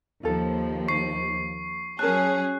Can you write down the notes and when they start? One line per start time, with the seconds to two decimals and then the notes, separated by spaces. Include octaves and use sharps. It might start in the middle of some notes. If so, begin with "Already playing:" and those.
0.23 D#2 F3 F4 A4
0.88 C#6 C7
1.99 F#3 C#4 G#4 A#4 A5 F#6